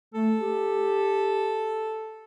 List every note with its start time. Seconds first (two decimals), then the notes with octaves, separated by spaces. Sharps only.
0.14 A3 A4
0.39 G4